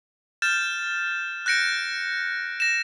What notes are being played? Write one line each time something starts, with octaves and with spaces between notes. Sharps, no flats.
F6 G6 A6 E7
F#6 G6 A#6 C#7 D7
A#6 E7